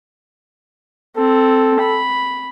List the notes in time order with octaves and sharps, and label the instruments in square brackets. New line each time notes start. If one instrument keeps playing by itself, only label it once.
[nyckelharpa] C4 [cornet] A4
[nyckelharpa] B5